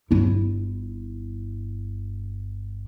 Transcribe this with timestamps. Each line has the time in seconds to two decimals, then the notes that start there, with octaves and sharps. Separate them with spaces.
0.11 G1 E4